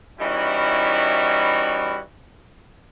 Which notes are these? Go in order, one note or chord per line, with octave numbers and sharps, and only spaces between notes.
E3 G3 C#4 D#4 E4 F#4